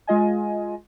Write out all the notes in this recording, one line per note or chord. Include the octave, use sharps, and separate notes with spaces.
G#3 F4 D#5 G#5